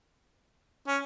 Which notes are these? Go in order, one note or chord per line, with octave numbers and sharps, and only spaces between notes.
C#4